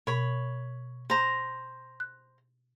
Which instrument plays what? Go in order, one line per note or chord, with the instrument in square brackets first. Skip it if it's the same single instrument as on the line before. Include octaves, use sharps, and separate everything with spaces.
[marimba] B2 [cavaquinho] C#5 B5
[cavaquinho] C5 A#5
[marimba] F#6